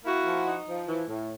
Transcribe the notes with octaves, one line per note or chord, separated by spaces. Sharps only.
A#3 E4 F#4
F3
D#4
F3
E3
A2